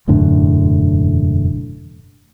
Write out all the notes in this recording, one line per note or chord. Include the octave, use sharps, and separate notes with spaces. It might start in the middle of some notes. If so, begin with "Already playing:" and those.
E1 F#2 A2 D3